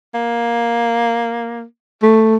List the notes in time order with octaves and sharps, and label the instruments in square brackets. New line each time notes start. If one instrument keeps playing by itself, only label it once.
[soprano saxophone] A#3
[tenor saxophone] A3